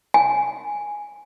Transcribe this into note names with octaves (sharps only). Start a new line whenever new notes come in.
G#5